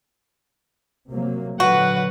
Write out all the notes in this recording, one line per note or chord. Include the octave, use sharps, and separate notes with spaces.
C3 F#3 A#3
A#2 D3 F#3 F#4 B4 F#5